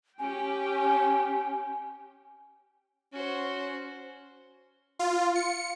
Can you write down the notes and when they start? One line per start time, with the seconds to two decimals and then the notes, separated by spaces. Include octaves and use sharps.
0.19 C#4 G4 G5 G#5
3.13 C#4 F#4 C5
4.99 F4
5.35 C#7